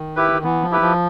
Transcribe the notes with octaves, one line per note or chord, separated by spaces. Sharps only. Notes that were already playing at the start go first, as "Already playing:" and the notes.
Already playing: D#3
E4 G4 B4
D#3
E3 B3
F3
E4 G4 B4
F3